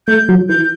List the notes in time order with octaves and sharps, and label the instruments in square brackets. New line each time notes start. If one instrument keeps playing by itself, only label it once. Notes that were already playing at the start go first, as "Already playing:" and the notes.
[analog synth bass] A3 [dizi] G6
[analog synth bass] F#3
[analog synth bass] E3 [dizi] G6